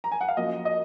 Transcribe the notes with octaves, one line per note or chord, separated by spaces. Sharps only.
A#5
G#5
F#5
F5
F#2 F3 A#3 D#5
D#5